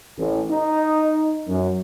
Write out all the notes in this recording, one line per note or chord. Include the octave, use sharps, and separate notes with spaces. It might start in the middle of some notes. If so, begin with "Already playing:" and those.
A1
D#4
F#2